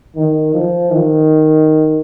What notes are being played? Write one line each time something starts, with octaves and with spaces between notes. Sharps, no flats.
D#3
F3
D#3